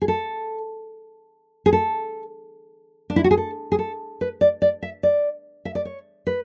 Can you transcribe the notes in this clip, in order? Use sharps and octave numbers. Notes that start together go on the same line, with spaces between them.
G#4
A4
G#4
A4
D4
E4
F#4
G#4
A4
G#4
A4
B4
D5
D5
E5
D5
E5
D5
C#5
B4